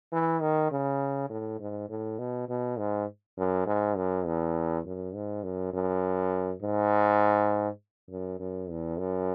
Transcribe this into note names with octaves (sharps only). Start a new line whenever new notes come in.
E3
D#3
C#3
A2
G#2
A2
B2
B2
G#2
F#2
G#2
F#2
E2
F#2
G#2
F#2
F#2
G#2
F#2
F#2
E2
F#2